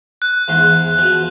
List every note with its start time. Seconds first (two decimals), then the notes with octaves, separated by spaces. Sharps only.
0.22 F#6
0.48 E2 G#2 C6
0.98 B2 F3